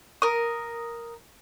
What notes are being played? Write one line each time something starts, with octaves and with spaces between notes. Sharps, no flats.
A#4 D#6